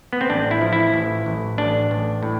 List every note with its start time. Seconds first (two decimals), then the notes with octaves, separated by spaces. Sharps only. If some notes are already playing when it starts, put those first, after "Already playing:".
0.13 B3
0.21 C4
0.30 A1 D4
0.51 E4
0.62 F3
0.73 E4
0.94 A1
1.26 A1
1.58 A1 D4
1.91 A1
2.23 A2